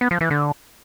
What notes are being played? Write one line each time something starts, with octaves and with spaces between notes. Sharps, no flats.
B3
F3
E3
D3